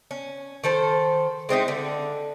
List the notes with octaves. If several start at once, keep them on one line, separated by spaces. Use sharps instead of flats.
C#4
D#3 A4 C5
G#3 C4 D#4 E4
D3